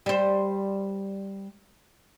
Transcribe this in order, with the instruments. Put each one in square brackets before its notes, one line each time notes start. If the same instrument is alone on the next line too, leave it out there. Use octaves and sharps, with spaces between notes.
[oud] G3 C5